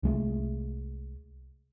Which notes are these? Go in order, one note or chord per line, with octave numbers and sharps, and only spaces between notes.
C2 G#3 A3